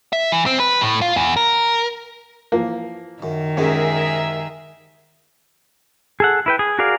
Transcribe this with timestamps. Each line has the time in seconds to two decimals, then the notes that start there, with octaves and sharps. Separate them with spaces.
0.13 E5
0.32 E3
0.46 C4
0.60 B4
0.81 A2
1.02 F4
1.16 E2
1.37 A#4
2.52 E3 F3 A#3
3.22 F#2 D#3
3.57 F#2 C3 G#3 C#4 G#4 A#4 E5
6.20 G#4 A4 F#5
6.46 E4 B4 G5
6.59 G#4
6.79 F#4 G#4 A#4 D5 F5